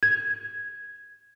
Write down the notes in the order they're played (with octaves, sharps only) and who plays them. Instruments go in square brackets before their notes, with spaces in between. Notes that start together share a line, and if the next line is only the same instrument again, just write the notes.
[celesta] G#6